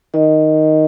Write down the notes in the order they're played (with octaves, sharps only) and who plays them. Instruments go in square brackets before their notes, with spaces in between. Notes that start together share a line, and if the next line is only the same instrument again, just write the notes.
[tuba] D#3 [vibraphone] D#5